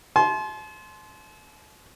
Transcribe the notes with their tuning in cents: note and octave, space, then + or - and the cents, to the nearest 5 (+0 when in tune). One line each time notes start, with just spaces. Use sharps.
A5 -45 C6 +0